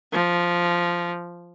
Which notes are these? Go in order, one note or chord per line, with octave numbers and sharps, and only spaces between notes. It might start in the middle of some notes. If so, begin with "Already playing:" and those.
F3